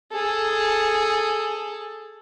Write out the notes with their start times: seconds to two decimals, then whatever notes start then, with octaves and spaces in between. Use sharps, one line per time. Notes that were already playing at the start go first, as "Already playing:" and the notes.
0.12 G#4 A4